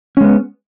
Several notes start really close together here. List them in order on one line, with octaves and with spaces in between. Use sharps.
C#4 G#3 B3